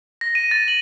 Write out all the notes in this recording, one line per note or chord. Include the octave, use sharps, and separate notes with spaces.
A#6
D#7
A6
F#7